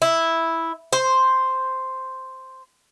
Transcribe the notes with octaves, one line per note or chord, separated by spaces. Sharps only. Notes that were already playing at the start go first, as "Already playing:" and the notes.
E4
C5